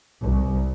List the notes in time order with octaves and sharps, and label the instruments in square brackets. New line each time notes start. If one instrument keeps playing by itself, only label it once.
[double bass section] C2